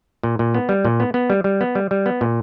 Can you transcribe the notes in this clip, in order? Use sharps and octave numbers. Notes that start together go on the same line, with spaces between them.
A#2
A#2
B3
G3
A#2
B3
B3
G3
G3
B3
G3
G3
B3
A#2